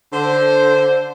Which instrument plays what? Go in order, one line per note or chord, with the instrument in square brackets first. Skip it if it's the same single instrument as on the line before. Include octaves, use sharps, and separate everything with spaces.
[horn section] D3 C5